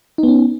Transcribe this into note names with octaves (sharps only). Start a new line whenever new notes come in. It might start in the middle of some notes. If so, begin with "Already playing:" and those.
B3 C#4 D#4